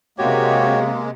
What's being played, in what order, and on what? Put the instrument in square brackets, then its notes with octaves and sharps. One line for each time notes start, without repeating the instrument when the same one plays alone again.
[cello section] C3 [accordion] G#3 [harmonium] A#3 [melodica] F#4 G4 C#5